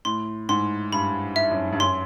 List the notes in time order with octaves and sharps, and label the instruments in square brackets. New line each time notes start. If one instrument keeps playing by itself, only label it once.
[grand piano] A2 [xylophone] C6
[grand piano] G#2 [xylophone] C6
[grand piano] G2 [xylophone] B5
[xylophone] E5
[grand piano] F#2
G2
[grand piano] F#2 [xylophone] C6